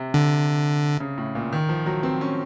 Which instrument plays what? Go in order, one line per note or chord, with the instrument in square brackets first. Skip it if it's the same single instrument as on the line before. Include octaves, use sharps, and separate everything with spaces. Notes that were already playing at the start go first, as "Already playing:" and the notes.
Already playing: [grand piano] C3
[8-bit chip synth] D3
[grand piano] C#3
A2
A#2
D#3
F3
F#3
C4
C#4